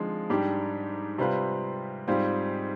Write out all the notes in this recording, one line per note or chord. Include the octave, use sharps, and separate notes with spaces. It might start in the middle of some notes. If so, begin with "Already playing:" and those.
Already playing: D3 F3 G#3 C4 D#4
G#2 G3 D4 G4
C3 G3 C4 F4 B4
G#2 G3 C4 F4